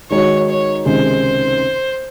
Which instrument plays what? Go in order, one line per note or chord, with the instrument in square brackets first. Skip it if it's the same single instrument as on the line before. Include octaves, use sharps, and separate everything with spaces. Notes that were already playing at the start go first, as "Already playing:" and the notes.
[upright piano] D#3 G#3 D#4 F#4 [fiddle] C#5
[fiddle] C#5
[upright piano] C#2 C3 D#3 G#3 D#4 [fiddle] C5